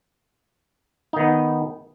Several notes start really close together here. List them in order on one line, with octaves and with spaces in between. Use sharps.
D#4 D#3 B3